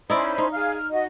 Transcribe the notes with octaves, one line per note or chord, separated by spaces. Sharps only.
C#4 D#4 E4 C5 D5 B5
D#4
G#4 F5 F6
F6
F#4 D#5